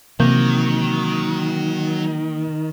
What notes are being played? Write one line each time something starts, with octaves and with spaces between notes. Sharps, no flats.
C3 D#3 E3 F#3 A#3 G6